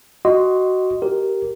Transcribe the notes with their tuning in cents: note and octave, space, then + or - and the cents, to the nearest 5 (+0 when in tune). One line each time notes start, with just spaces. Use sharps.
F#4 +15 D#5 +0 C6 +0
G4 -15 A#4 +0